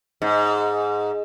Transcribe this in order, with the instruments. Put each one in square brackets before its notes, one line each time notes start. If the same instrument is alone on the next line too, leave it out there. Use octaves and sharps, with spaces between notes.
[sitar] G#2